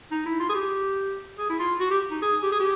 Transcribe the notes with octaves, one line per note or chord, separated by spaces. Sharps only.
D#4
E4
F4
G#4
G4
G#4
E4
F4
F#4
G4
D#4
G#4
G4
G#4
G4